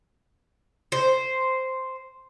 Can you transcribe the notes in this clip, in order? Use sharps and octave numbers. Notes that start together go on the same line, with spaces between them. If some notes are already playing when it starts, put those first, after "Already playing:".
C5